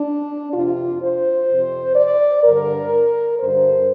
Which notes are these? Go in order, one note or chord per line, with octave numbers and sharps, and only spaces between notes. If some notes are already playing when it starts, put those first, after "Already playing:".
Already playing: D4
F2 C3 F4
C5
F2 C3
D5
G2 D3 A#4
G2 D3 C5